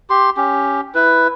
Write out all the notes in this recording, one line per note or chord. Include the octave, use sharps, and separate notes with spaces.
G4 C6
C#4 G4
E4 B4